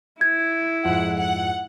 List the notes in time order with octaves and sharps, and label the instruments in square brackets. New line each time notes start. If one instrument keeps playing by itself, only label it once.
[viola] E4 [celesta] G#6
[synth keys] F2 G#2 [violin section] F#5
[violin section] F#5